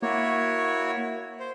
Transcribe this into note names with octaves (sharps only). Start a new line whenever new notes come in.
A#3 E4 F#4 C#5
C5